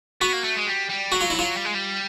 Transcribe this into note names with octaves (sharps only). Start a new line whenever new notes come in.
B3 F#4
A#3
A3
G#3
G3
G3
F#3 F#4
F4
E4
F#3 F4
G3
G#3
G3